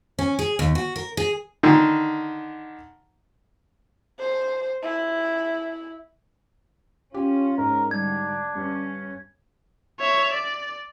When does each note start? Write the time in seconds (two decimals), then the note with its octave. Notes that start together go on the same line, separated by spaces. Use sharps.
0.19 C#4
0.39 G#4
0.59 D#2
0.75 F#4
0.96 A#4
1.17 G#4
1.63 D3 D#3
4.19 C5
4.83 E4
7.14 C#4 F4 G4
7.58 G#2 A#4
7.91 D3 G3 D4 G#6
8.55 G2 C#4
10.00 C#5 E5
10.33 D5